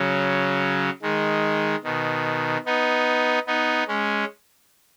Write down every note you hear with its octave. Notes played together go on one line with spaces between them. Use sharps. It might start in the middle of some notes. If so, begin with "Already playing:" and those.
Already playing: C#3 F#3
D#3 G#3
B2 D#3
B3 D#4
B3 D#4
G#3 C#4